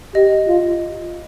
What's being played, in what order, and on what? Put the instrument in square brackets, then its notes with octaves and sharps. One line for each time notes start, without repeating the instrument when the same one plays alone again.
[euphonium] G4 [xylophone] D#5
[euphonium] F4